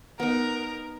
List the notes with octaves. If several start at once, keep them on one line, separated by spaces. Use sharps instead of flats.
B3 D#4 A#4